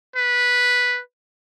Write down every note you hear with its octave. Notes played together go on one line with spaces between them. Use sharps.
B4